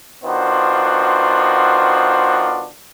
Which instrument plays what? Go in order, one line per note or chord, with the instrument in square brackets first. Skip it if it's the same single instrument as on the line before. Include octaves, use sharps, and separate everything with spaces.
[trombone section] D#3 B3 D4 F4 F#4 C5